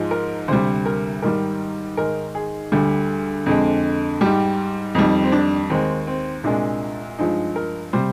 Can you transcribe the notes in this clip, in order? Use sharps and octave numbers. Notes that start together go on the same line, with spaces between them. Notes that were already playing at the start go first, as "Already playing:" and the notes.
Already playing: G#2 F3 G#3
A#4
D2 C3 G3 C5
A#4
G#2 D#3 G3 A#4
G#2 D#3 G#3 A#4
G#4
D2 D3 G3
F2 D3 G#3
G#2 G3 G4
F2 D#3 G3 D#4
C4
D4
D#2 D#3 G#3 C4
C4
C2 A#2 G#3 D4
G2 F3 G#3 D#4
A#4
C3 G3 C5